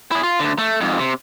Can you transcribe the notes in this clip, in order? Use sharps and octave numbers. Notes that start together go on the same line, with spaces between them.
E4 G#4
F4
D2 D3
A3
F2 G#2
C3